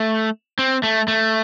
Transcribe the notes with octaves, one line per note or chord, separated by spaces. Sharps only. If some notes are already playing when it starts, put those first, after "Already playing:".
Already playing: A3
C4
A3
A3